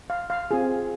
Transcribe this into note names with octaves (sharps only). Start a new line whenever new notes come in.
F5
F5
C4 F4 G#4